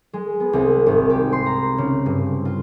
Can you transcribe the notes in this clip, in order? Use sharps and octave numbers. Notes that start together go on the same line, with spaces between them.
G#3
B3
C2
G#1
G4
C6
A#5
C#3
G2
F4